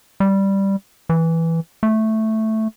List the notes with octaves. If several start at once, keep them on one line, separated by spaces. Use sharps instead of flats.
G3
E3
A3